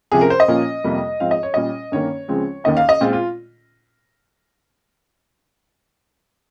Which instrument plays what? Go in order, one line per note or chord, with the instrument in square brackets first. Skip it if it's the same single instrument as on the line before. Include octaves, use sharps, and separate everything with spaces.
[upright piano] C#2 C3 F3 G#4
A#4
C5
D#5
A#2 F3 A#3 C#4
F2 C3 G3 A#3
G#2 F3 C4 F5
D#5
C#5
A#2 G3 C#4 D#5
G2 D#3 A#3 C#4 C#5
C#2 C#3 F3 G#3 C4
D#2 D#3 A#3 C#4 D#5
F5
D#5
A#2 G#3 C4 F4
F4